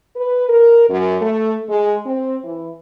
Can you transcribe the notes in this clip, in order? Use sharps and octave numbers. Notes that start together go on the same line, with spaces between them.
B4
A#4
F#2
A3
G#3
C4
E3